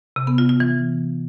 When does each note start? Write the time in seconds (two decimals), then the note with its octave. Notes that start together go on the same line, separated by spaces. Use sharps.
0.16 C3
0.27 B3
0.38 F4
0.49 F4
0.60 E3